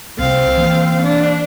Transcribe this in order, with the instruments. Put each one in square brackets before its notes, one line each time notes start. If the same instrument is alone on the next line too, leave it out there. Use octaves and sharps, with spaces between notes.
[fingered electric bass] C2 C3 [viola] C4 F5
[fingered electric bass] E3 A#3
[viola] D4